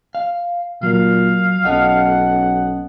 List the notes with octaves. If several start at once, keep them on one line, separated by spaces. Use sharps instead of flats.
F5
A#2 F#3 F5
B1 C#4 A4 D#5 F#5